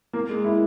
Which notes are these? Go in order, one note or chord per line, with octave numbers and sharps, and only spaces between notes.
A#3
G#3
E4